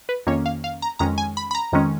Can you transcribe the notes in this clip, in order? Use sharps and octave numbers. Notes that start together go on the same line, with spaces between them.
B4
F2 D#3 A#3 C#4 C#5
F5
F5
A#5
F2 D#3 G#3 C#4 A#5
G#5
B5
B5
A#5
F2 D#3 G#3 C#4